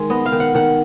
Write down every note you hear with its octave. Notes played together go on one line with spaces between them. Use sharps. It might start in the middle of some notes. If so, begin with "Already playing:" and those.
Already playing: D#3 G#3
B3 D#5
F5
D#3
F#5
D#3 F#5